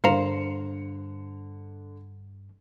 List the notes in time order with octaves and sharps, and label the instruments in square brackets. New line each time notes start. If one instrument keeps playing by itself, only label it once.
[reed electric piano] G2 [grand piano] D3 C#7 [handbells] A#4 F5 A#5 [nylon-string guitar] C5